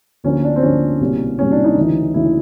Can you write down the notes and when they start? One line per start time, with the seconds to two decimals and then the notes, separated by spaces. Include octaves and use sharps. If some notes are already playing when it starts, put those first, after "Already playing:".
0.24 D2 D3 F3 A#3 C#4
0.44 D4
0.56 C4
0.62 D2 D3 F3 A#3 C#4
1.00 C2 B2 G3 A#3
1.39 C2 B2 G3 A#3 C#4
1.51 D4
1.64 D#4
1.76 D2 C#3 E3 A3
2.14 D2 C#3 E3 A3 E4